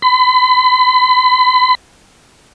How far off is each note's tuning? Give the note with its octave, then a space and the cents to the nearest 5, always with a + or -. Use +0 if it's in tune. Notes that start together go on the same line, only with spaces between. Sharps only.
B5 +40